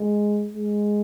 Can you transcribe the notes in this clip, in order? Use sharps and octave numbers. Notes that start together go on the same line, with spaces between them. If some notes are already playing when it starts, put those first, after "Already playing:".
Already playing: G#3
G#3